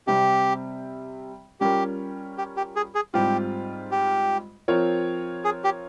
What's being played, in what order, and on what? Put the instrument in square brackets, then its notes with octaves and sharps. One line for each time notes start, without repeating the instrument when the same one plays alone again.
[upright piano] C3 G3 C4 [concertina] G4
[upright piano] G3 C#4 F4 A#4 [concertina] G4
[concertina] G4
G4
G#4
G#4
[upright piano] G#2 G3 C4 F4 [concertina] G4
[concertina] G4
[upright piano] F3 C4 F4 A#4 C#5
[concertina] G#4
G4